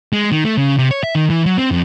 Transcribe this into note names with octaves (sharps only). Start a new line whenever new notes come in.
G#3
D#3
A3
C#3
C3
C#5
E5
D#3
E3
F#3
C4
F2